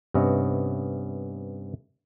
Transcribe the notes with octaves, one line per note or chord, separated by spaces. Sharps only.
G2 C3 B3 C#4 D#5 E5